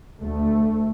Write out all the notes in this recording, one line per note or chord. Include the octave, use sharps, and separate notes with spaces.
D2 A3